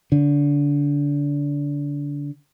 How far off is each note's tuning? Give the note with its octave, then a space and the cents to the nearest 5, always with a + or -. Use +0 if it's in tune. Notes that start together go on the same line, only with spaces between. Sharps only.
D3 -25